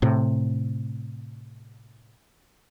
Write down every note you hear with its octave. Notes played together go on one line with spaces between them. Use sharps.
A2 C3